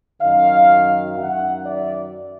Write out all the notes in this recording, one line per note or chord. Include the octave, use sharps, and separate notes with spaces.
F#2 D#3 D#5 F5
F#2 D#3 E5 F#5
D5 E5